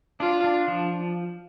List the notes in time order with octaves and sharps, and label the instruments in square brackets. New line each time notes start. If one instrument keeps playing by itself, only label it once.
[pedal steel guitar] D4 [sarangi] F4
[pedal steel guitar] D4
F3